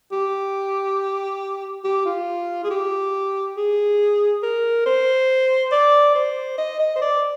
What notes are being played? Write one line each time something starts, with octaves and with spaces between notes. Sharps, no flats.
G4
G4
F4
G#4
G4
G#4
A#4
C5
D5
C5
D#5
D#5
C5
D5